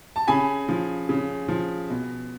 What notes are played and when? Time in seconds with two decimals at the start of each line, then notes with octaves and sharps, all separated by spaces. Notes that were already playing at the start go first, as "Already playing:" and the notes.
0.16 A5
0.28 C#3 G#5 B5
0.69 F3
1.09 C#3
1.48 F3
1.90 B2